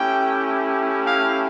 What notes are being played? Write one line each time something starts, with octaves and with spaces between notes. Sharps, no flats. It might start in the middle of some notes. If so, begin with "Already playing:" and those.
Already playing: A3 C#4 E4 G4 G5
F5